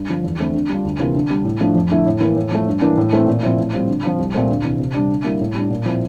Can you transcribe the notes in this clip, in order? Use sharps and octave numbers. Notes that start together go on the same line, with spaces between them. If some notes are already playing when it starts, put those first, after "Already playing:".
Already playing: G2
D3 F3
E2
D3 A3 C4
D3
G3 D4 F4
D2
C3 E3 A#3 F4
D3
G3 D4
A2
F3 A3 D4
F2
D3 A3 E4
A2
E3 A#3
A2
F3 A3
G2
E3 A#3 D4
A2
E3 A3 C4
A#2
F3 C4 E4
A2
G3 C4 F4
D3
F3 C4 F4
C2
A#2 A3 C4
D2
C3 E3
C3
G3 D4
D3
G3 A#3 E4
A2
G3 D4
A#2
F3 C4 E4